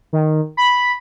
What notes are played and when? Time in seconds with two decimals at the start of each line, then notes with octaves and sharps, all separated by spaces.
0.13 D#3
0.57 B5